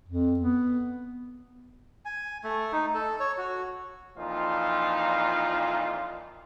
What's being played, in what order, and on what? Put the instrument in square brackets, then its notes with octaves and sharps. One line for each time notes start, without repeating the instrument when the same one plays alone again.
[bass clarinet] F2
B3
[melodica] G#5
A3
D#4
A4
C#5
F#4
[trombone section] F2 A#2 E3 F3 D#4 F4